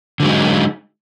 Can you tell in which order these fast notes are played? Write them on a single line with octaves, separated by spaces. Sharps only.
D3 F#3 G#3 D#4